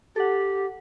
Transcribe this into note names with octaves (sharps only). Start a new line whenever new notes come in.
G4 A4 F#5